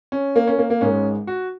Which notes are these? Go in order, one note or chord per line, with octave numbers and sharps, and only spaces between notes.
C#4
A#3
C#4
A#3
A#3
G#1 G#2 G#3 C#4
F#4